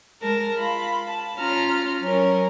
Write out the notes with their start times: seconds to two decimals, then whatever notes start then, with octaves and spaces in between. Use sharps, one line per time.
0.21 G#3 A#4 A5 A#6
0.56 F4 B5
1.05 A5
1.37 C#4 F4 A#5 F6
2.00 F#3 C#4 A#4